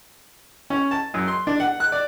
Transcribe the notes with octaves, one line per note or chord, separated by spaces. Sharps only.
C#4
A5
F#2
C6
D4
F#5
F#6
D5